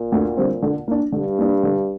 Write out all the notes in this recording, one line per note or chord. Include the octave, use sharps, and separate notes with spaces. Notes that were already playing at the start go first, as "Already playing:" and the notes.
Already playing: A#2
D2
D3 G3 C4
D3
A#3 D4
G2 D3
A#3 D4
D3